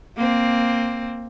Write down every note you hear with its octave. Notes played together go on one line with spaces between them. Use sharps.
A#3 C4